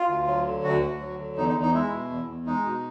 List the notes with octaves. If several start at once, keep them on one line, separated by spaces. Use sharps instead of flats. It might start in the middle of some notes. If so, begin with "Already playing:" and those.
Already playing: F4
D2
F#3
D3
D2 F#4
D2
F#3
D3
E2 D#4
D#4
E2
D#4
G#3 E4
B2
E2
E2
G#3 D#4
B2